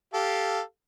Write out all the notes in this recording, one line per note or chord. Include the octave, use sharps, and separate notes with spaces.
G4 A4 F5